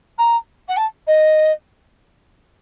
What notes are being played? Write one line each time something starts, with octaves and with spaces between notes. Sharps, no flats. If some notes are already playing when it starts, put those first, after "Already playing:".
A#5
F#5
A5
D#5